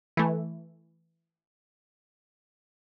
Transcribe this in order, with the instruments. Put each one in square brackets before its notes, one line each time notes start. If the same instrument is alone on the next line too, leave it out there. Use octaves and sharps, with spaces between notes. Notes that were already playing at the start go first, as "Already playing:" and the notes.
[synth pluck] E3 A3